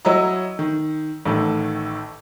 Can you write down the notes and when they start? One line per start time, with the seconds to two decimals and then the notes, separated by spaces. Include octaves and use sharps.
0.05 F#3 E4 C#5 D#5 A#5 E6
0.59 D#3
1.25 A1 A2 D#3 A3